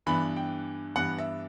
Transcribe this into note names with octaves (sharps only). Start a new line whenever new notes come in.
G2 E3 B3 D4 B5
G5
G2 E3 B3 D4 F#5
E5